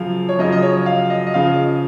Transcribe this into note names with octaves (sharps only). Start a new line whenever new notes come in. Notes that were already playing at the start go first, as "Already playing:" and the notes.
Already playing: F#2 C#3 F3 F5
C#5
F#2 C#3 F3 D#5
D#5
C#5
F5
D#5
D#5
C#3 F3 F5